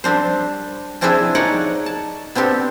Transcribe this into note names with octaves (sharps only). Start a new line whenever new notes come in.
G3 C4 D4 C5
C3 C4 D4 E4 G#4 E5
D#4 C#5 D5 F#5
A5
B3 C4 D4 G4 A4